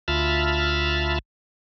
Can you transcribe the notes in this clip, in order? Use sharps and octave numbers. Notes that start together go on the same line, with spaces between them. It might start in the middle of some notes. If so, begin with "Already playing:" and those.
D2 F4 E5 A5 B5 F6